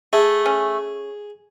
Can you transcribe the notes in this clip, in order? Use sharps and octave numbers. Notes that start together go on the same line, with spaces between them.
A3 G#4
C#4